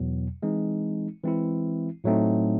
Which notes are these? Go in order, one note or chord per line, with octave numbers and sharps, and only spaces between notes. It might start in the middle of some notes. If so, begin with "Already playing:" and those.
Already playing: E2 B2 F#3
E3 G#3 C4 D#4
E3 G#3 C4 E4
A2 F#3 A3 C4 D#4